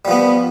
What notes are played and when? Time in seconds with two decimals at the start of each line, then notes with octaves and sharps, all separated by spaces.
0.05 G3
0.08 F3
0.11 B3